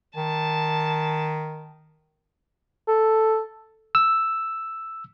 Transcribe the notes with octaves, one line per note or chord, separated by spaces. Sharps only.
D#3 A5
A4
E6